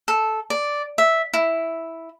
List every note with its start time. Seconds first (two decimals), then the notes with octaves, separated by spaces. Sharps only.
0.08 A4
0.50 D5
0.98 E5
1.34 E4